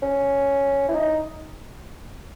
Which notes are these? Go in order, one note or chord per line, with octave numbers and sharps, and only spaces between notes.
C#4
E4
D#4